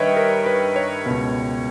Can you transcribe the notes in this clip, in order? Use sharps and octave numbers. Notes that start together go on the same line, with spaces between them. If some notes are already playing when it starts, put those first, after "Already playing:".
Already playing: G2 D#3 B4 C#5 D#5 E5 G5
A#4
B4
C#5
C#2 B2